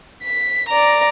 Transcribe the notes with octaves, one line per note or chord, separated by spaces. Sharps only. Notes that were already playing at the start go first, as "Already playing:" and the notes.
B6
D5 A#5